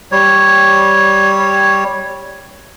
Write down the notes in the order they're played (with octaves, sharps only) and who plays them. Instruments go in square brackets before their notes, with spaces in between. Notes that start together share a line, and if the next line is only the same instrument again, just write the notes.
[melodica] G3 C#5